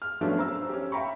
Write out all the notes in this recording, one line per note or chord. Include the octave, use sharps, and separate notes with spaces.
F6
F3 F#3 A3 B3 C#4 D4
C5 A#5 E6
C#4 G4
E5 F5 G5 A#5 B5 C#6